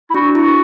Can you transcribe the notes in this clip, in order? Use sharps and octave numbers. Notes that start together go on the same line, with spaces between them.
E4
D4 F#4
E4 F#4